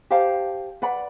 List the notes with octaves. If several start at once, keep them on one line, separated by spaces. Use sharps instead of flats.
G4 C5 F5 A5
B4 D5 F#5 B5